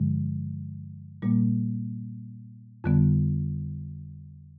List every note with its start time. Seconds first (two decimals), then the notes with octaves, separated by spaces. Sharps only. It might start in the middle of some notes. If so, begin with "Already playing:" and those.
Already playing: G2 D3 F3 G#3
1.22 A#2 G3 A#3
2.84 F2 D3 G3 B3